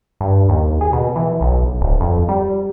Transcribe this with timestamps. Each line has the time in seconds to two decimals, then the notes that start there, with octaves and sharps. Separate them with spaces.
0.21 G2
0.49 D#2
0.81 G#4
0.93 B2
1.16 E3
1.41 B1
1.81 D1
2.01 F2
2.29 G3